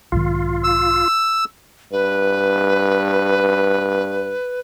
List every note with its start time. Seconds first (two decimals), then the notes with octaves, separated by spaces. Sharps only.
0.12 B1 G#2 D#3 F4
0.64 E6
1.92 G2 B4